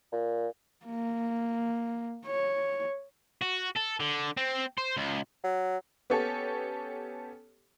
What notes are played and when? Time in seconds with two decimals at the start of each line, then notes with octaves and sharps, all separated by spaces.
0.12 A#2
0.85 A#3
2.26 C#5
3.42 F#4
3.77 A4
4.00 D3
4.37 C4
4.78 C5
4.97 C#2
5.44 F#3
6.10 B3 C#4 G4 A4 C#5